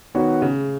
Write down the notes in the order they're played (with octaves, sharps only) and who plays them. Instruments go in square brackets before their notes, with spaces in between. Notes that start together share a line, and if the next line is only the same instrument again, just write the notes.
[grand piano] D#3 B3 F#4 C#5
[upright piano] C#3